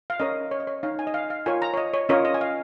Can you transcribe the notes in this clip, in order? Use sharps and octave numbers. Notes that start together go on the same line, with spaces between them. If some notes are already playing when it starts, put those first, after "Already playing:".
F5
C#4 A#4 C#5 D#5
C#5
D#5
C#5
D#4 C#5 F5
G#5
D#5
F5
F5
F4 A#4 C#5 G#5
A#5
C#5
D#5
C#5
C#4 F4 A#4 C#5 D#5
D#5
G#5
F5